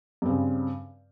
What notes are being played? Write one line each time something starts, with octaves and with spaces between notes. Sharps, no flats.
G2 C#3 C4